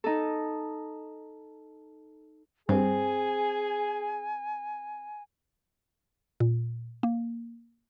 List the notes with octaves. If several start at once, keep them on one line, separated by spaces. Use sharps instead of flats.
D#4 A4
G2 C4 G#4 G#5
A#2
A#3